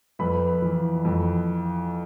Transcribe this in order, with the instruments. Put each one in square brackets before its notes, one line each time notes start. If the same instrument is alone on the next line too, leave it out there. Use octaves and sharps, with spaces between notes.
[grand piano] F2 B4 B5
E3
F2